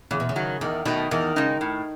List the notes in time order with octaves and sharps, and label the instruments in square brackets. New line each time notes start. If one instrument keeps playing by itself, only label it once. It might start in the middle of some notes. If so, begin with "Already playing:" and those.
[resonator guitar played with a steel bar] E2 [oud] C#3
[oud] B2
C#3
[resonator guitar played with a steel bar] D#3 F#3
[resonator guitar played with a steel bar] E2 [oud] D#3
[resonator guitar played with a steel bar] B2 A3 [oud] D#3
[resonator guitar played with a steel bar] E2 [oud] D#3
[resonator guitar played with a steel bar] C#3 G#3 D#4
A2